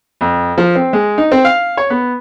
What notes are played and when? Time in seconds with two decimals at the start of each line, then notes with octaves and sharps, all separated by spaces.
0.21 F2
0.58 F3
0.76 C4
0.93 G#3
1.18 D#4
1.32 C4
1.45 F5
1.77 C#5
1.90 B3